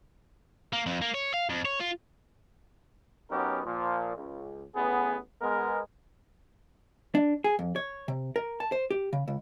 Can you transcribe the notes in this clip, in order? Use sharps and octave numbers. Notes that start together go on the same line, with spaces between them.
A#3
F2
A#3
C#5
F5
F2
C#5
F4
F#3 B3 C#4 D#4 G4 A#4
A#2 F3
C#2
A1 B3 G#4
G#3 B3 A#4
D4
G#4
F2
C#5
C3
A#4
A5
C5
G4
C#3
C#2